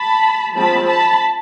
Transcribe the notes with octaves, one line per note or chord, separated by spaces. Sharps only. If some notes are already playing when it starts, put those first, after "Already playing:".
Already playing: A5 B5
F3 G#3 C4 A5 B5
A5 B5